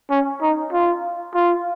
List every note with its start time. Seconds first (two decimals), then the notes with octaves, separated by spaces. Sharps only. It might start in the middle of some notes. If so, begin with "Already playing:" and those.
0.10 C#4
0.42 D#4
0.73 F4
1.35 F4